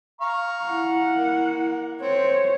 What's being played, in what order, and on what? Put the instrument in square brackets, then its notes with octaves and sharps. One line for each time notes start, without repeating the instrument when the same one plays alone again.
[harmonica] F5 A#5 C#6
[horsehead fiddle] E4 F#5
[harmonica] A#3
[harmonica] C4 [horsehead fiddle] C5 C#5